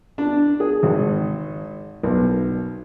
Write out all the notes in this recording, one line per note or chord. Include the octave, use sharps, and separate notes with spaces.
D4
G#4
G#1
B1